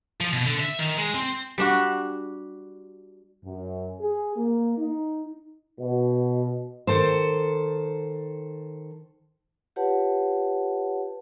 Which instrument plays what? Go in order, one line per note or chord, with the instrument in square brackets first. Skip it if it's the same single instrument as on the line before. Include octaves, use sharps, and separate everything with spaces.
[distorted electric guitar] F3
B2
D3
E5
D#3
G#3
C4
[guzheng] G3 D4 F#4
[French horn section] F#2
G#4
A#3
D#4
[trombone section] B2
[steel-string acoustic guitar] D#3 A4 C5
[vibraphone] F4 G4 B4 C#5 F#5 A5